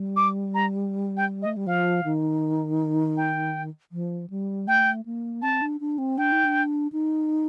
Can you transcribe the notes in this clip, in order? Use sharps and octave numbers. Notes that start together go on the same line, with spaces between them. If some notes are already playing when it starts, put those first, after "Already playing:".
Already playing: G3
D6
A#5
G5
D#5
A3
G3
F3 F5
D#3
G5
F3
G3
A3 G5
A#3
C4 A5
D4
D4
C4
D4 G5
D#4
D4
D#4